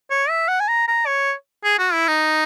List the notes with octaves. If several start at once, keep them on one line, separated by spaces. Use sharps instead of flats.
C#5
E5
F#5
G#5
A#5
A#5
C#5
G#4
F#4
E4
D#4